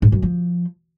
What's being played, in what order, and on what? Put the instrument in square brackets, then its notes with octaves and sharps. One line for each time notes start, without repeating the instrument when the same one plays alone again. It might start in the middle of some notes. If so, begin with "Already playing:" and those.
[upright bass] G#2
F#2
F3